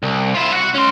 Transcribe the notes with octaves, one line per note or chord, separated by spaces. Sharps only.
C2
E4 F4
F#4 F#5
C#4 C6